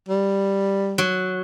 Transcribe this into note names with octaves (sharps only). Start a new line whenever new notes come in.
G3
F#3